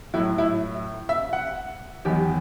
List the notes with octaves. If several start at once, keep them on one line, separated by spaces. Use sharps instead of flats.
A2 F#3 E4
E4
E5
F#5
E2 D#3 F#3 G4